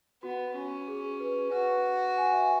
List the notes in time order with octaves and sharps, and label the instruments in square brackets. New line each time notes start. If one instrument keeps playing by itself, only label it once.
[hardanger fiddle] B3 [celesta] F#4
[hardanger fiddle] C#4 [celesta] F#4
[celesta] G#4
B4
[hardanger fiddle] F#4 [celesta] B4
[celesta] G#5
F#5
E5 G#5